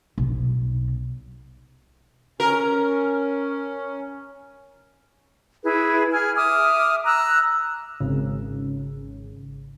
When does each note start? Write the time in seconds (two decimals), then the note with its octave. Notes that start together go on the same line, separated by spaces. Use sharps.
0.18 B1
2.40 C#4 A#4
5.63 E4 G#4 B4
6.12 G#4 G#5 F6
6.35 E5 D6 D#6 F6
7.05 A#5 E6 F#6
8.00 G#1 C#3